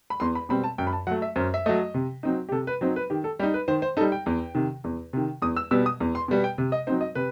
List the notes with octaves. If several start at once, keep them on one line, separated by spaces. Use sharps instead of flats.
B5
E2 C6
B5
B2 G3 C4 B5
A5
F#2 G5
B5
A5
F#3 A3 F#5
E5
F#2 C5
E5
F#3 A3 D#5
C3
F#3 C4 D#4
G4
C3 A4
B4
F#3 C4 D#4 C5
B4
D#3 G4
A4
G3 D#4 G4
B4
D#3 C5
C5
G3 D#4 A4
G5
E2
C3 D#3
E2
C3 D#3
E2 D#6
E6
B2 G3 B3 E6
D#6
E2
C6
B2 G3 B3
G5
C3
D#5
F#3 C4 D#4 C5
D#5
C3 B4